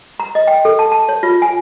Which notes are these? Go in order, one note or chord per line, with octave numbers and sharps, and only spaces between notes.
A#5
D#5
G5
A4
A5
A5
C#5
F4
G#5